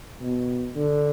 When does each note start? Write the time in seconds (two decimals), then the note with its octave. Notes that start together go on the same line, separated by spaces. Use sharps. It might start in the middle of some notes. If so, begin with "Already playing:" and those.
0.21 B2
0.75 D3